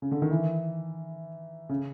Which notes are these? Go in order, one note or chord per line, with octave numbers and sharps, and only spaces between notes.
C#3
D3
D#3
E3
C#3